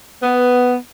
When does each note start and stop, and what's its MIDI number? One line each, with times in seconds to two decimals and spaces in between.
0.23 0.75 59